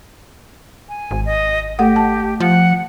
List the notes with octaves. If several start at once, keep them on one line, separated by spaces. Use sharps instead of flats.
G#5
G#1
D#5
A3 G4 A4 F#5
A5
F3 F#5